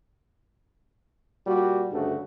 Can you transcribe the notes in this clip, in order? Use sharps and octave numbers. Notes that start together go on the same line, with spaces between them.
A#2 G3 F#4
D2 G2 C#3 A3 F#4